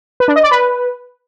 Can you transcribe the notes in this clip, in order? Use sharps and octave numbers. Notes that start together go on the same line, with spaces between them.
B4
D4
D#5
D5
B4